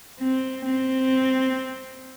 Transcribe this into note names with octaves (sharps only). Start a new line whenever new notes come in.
C4
C4